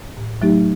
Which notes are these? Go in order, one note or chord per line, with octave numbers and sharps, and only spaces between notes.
A2
F#3 A3 D#4 G4